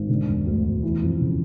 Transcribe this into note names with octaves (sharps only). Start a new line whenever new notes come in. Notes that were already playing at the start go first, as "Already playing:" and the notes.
Already playing: G#1
D3
E1
D2
E1
E3
F2
C#3